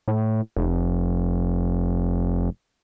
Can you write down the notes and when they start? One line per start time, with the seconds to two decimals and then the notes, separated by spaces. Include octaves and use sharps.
0.08 A2
0.56 F1